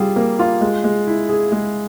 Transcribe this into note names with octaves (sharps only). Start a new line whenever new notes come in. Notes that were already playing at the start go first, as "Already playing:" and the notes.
Already playing: G3 F4 G#4
A#3
F4
G#3
G#3
E4
G#4
G#3